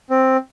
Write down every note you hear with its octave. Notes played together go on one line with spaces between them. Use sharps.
C4